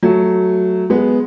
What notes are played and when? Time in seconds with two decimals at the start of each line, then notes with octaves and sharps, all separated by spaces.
0.03 F#3 A3
0.90 G#3 B3